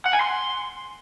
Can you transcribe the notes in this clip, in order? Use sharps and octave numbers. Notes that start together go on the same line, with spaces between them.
F#5
G#5
C6